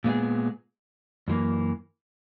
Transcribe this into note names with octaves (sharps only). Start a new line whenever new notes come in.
A#2 G#3 B3 E4 G#4
F#2 E3 A#3